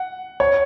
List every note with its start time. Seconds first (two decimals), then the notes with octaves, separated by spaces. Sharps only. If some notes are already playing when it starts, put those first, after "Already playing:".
Already playing: F#5
0.40 C#5